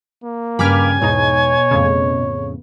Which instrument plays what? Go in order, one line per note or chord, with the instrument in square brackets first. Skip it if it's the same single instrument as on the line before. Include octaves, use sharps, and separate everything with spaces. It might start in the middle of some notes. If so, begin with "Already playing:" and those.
[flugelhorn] A#3
[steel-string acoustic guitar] G2 C#3 G3 [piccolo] G#5 [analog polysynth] B5 D6 F6
[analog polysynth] E2 G#2 D#4 [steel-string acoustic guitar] B2 [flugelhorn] C#5
[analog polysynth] F2 A2 C#3